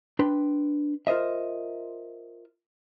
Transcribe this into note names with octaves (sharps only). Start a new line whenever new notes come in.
D4 B4 G5 C6
F4 A#4 C5 D#5 E5